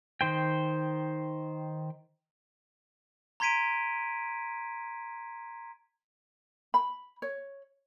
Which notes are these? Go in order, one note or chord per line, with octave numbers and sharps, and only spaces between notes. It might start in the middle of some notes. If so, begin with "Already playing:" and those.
D#3 C5 G5
A#5 C6 G#6 B6 D7 D#7
B5
C#5